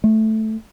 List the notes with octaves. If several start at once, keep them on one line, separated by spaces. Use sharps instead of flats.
A3